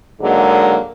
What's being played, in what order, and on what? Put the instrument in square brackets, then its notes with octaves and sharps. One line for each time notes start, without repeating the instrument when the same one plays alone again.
[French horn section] G#2 D3 F#3 G#3 A#3